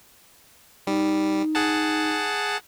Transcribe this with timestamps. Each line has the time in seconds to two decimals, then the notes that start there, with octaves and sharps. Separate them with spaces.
0.87 G3 D#4
1.55 G#4 F#5 A5